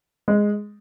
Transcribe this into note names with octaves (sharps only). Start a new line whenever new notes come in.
G#3